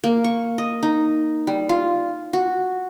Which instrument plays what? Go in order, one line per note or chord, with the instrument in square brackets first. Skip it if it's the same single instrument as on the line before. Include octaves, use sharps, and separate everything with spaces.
[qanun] A#3
C#6
D#5
D#4
G3
F4
F#4